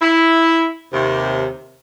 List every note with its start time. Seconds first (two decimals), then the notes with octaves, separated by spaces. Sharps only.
0.02 E4
0.93 D#2 C3